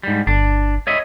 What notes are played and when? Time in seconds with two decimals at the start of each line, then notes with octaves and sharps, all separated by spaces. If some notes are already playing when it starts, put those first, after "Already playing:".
0.03 G#2 G3
0.27 G1 D4
0.87 C#5 D#5 E5